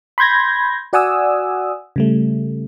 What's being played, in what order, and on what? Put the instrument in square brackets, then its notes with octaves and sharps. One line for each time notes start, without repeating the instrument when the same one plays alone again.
[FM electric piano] B5 C6 G6 G#6 A#6
F#4 D5 F#5 G#5 D#6 E6
C#3 G3 A3